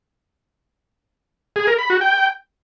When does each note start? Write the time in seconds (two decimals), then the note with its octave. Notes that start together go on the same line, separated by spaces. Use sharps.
1.56 G#4
1.67 A#4
1.78 B5
1.90 F#4
2.01 G5